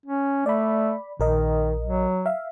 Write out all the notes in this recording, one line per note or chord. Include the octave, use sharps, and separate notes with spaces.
C#4
A3 D5 B5
A#1 D#3 A#4 D#5
F#3
E5 F5